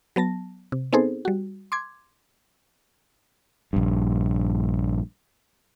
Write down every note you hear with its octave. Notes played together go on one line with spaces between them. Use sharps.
F#3 B3 A5 A#6
C3
B3 C4 D#4 G#4 A4 C5
G3 F#4
C6 D6 G#6
A#1 G2